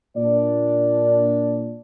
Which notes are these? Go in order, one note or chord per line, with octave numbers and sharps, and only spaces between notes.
A#2 D4 D5